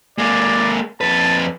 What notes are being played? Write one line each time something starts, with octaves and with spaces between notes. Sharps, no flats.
G#3 A#3 D5
F2 B4 A5